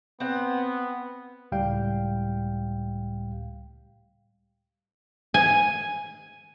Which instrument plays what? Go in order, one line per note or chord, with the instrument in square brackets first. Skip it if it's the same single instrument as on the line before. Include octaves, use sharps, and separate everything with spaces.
[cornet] B3 [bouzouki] C4 F#5
[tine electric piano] C#2 A2 G3 F5 G5
[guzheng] G#5